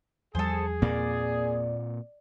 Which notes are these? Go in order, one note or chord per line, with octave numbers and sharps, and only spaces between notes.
E2 F3 G3 G#4 A4 C5
A#2 A#3 C4 D5